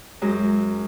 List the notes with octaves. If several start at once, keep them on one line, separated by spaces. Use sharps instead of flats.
F#2 G#3